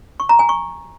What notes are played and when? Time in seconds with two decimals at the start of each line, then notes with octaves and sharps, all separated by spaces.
0.20 C#6
0.29 A#5
0.39 G#5
0.49 C#6